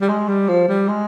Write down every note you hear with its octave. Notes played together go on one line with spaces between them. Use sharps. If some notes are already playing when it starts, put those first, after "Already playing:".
G3
G#3
G3
F3
G3
G#3